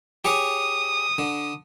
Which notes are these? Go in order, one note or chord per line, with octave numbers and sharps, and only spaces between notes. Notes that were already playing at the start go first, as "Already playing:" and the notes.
G4 G#4 C#5 D#6
D3